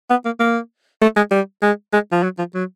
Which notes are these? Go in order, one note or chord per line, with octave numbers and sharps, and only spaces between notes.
B3
A#3
A#3
A3
G#3
G3
G#3
G#3
F3
F#3
F3
F#3